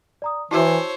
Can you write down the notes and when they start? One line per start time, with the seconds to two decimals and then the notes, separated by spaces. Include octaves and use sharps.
0.22 D5 A#5 D#6
0.51 E3 E4 F#4 C5 C#5 E5 A5 E6